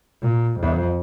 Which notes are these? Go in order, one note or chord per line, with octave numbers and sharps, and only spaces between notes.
A#2
F2